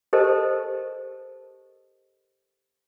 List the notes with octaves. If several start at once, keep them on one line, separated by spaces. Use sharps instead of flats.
G4 A4 A#4 C5 D#5 A5